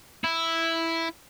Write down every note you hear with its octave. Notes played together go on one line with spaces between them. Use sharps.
E4